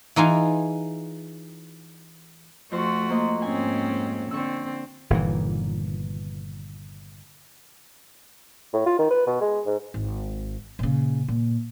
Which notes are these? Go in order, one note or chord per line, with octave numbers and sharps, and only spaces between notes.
E3 D#4 F4 G#4
F2 A3 F#4 C5 C#6
A#3 C5 D#5
G#2 C4 C#4 G#5
D3 C4 C#6 E6
G1 A#2 D#3 E3
A2
F4
D#3
B4
B2
G#3
G#2
G#1
A#2 C#3
A#2